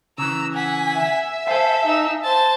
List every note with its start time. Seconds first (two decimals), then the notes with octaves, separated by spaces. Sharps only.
0.18 C#3 E3 A#5 E6
0.53 F#5 G#5 B6
0.93 E5
1.47 A4 C5 F5 G#5
1.84 D#4 E6
2.23 C5 A5 A6